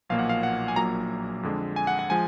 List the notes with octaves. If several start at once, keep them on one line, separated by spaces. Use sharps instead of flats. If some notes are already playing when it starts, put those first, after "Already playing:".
B1 A#2 F3 A#3 F5
F#5
F5
F#5
G#5
A#1 A#2 F#3 A#3 A#5
F2 D3 G#3
G#5
F#5
F#5
F3 G#3 G#5